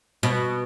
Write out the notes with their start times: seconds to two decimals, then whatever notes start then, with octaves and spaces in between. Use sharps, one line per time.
0.23 B2